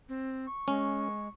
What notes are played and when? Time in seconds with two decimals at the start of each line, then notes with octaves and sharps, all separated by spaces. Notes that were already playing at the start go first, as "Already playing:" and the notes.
0.09 C4
0.47 C#6
0.68 G#3 C#4